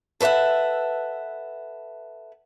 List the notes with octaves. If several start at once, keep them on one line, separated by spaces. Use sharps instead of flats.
A4 B4 C5 E5 F#5